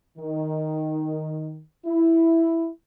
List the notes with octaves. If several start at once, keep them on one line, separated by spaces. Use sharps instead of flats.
D#3
E4